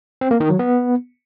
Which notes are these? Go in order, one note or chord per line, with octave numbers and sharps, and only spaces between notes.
C4
A#3
D#3
F#3
B3